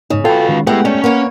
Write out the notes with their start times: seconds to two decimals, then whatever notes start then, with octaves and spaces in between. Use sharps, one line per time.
0.10 G#2 C#3 D#4
0.25 F4 F#4 A4 B4 G5
0.49 D#3 G#3 C#4
0.67 G#3 A3 B3 E4 G4 F#5
0.85 G3 A3 C#4
1.04 A#3 B4 C#5 F#5